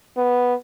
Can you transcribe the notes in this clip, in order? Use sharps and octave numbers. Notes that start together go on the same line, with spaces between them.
B3